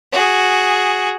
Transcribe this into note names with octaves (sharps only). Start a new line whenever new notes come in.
F#4 G#4